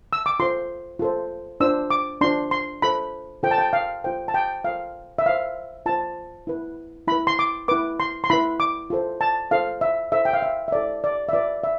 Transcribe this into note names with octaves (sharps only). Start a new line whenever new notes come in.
E6
D6
F4 A4 C5 C6
F4 A4 C5
D4 F4 C5 E6
D6
D4 F4 C5 C6
C6
F4 A4 C5 B5
F4 A4 C5 G5
A5
G5
F5
F4 A4 C5 G5
A5
G5
F4 A4 C5 F5
E5
F4 C5 F5
F4 C5 A5
E4 B4
E4 B4 B5
C6
D6
E4 B4 D6
C6
C6
E4 B4 B5
D6
F4 A4 C5
A5
F4 A4 C5 F5
E5
E4 A4 C5 E5
G5
F5
E5
E5
E4 A4 C5 D5
D5
E5
F4 B4 D5
E5